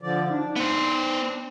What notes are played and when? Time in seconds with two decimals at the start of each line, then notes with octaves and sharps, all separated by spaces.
0.02 D3 F3 D5
0.30 D4 D#4
0.56 B3 C5